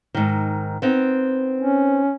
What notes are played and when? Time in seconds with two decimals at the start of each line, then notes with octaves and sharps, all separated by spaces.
0.15 G#2 D#3
0.82 B3 C4 D#4
1.62 C#4